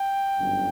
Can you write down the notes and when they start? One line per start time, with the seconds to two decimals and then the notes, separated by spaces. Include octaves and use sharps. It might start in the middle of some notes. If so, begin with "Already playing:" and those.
Already playing: G5
0.39 G1 F#2 D3